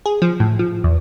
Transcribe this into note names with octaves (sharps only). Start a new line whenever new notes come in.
G#4
F3
A2
F3
E2